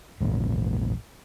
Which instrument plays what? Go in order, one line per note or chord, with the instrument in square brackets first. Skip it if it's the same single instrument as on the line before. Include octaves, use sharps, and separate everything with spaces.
[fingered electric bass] A#1 E2 G#2